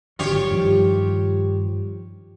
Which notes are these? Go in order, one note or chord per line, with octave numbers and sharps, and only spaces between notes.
G#1 D3 F#3 F4 G4 C#5
G2 D#3 F3